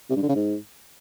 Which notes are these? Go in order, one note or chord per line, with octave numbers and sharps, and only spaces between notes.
C3
G2
D3
C#3
G#2